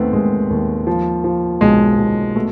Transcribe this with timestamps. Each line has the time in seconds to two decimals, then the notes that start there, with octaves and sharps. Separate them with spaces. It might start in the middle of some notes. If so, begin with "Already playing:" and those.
Already playing: D#2 D#3 A3 B3 C4
0.13 D#2 G#3
0.50 D#2
0.87 F3
1.24 F3
1.61 B1 G#3
1.98 B1
2.35 B2 A3